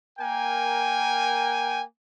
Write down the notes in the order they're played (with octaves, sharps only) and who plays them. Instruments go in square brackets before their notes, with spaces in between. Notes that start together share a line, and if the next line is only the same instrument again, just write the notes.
[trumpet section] A#3 A#4 G5 G#5